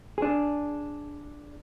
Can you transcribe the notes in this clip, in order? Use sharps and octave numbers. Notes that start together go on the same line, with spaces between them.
D4 G#4